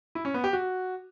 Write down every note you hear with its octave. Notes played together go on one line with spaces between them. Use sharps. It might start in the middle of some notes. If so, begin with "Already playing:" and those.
E4
C#4
B3
G4
F#4